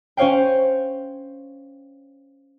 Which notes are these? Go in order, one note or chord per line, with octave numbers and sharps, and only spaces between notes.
C#4 C5 C#5 F5 G5